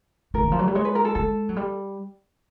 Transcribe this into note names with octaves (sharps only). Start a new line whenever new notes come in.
A3 A#4
E3
F3
F#3
G3
G#3 C#5
B4
A#4
A4
G#3 A4
F#3
G3